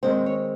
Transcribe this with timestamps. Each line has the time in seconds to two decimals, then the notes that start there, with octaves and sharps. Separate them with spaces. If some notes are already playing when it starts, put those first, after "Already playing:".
0.03 D#3 G#3 C4 C5
0.26 C#5